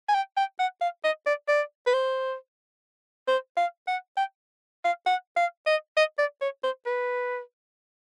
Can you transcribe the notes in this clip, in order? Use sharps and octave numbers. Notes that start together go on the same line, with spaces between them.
G#5
G5
G5
F#5
F5
D#5
D5
D5
B4
C5
C5
F5
F#5
G5
F5
F#5
F5
D#5
D#5
D5
C#5
C5
B4